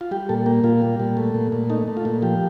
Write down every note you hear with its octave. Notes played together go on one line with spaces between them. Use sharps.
F4
G3 G4
A#2 A4
A#3 G4
A#2 F4
G3
A#2
A3
A#2
A#2
A3 D#4
A3
F4
A#2
F3 G4